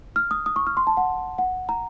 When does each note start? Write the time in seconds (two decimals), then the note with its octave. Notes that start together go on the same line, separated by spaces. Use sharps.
0.16 F6
0.31 D#6
0.46 D#6
0.56 C#6
0.67 F6
0.77 C6
0.87 A5
0.97 F#5
1.38 F#5
1.69 A#5